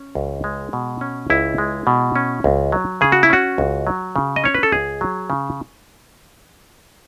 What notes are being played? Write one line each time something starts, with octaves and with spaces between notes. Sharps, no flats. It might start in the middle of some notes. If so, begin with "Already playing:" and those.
Already playing: C#4
C#2
G#3
B2
C#4
C#2 E4
G#3
B2
C#4
C#2
F#3
C#3 G#4
F#4
E4
C#4 F#4
C#2
F#3
C#3
D#5
C#4 C#5
B4
A4
C#2 G#4
F#3
C#3